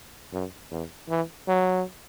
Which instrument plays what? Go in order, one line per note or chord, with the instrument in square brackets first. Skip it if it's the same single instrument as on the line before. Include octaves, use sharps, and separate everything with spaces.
[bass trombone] F#2
E2
E3
F#3